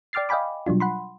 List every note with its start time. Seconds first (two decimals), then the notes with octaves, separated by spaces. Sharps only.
0.13 D5 G5 D6 F6 A6 C7
0.29 D#5 F5 G5 G#5 B5 D6
0.66 B2 F#3 G3 D4 F4
0.80 F#5 B5 C6